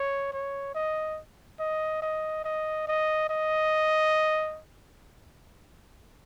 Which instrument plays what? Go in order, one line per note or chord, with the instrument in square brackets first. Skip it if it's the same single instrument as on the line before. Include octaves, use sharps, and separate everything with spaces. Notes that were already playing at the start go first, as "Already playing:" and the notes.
Already playing: [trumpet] C#5
C#5
D#5
D#5
D#5
D#5
D#5
D#5